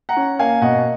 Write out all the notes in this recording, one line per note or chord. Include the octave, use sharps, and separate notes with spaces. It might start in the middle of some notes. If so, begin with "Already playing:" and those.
F#5 A#5
C#4
A#3 F5 G#5
B2 D#5 F#5